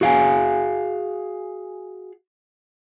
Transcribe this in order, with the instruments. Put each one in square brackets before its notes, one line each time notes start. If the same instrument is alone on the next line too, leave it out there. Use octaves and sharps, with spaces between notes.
[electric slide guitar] F#4 G#4 F5 G5 G#5